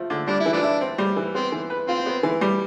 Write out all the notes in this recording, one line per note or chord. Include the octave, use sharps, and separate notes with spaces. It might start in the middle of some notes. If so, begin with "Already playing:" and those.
Already playing: F3 A3
D3
G3 D4
E4
E3
F3 A3 D4
E4
C4
G3
E3
B3 C4
E3
B4
C4 F4
B3
E3
G3